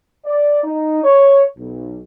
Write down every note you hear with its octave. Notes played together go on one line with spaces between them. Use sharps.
D5
D#4
C#5
B1